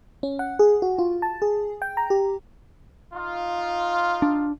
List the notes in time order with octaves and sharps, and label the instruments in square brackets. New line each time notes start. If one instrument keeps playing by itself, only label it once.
[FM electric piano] C#4
F#5
G#4
F#4
F4
A5
G#4
G5
A#5
G4
[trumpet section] D#4 F4
[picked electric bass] D4